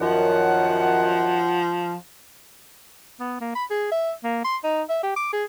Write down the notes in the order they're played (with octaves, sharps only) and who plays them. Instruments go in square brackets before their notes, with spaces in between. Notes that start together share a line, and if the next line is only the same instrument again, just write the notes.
[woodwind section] F#2 D#3 F#5 [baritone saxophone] F3
[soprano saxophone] B3
A#3
B5
G#4
E5
A#3
C6
D#4
E5
G4
D6
G#4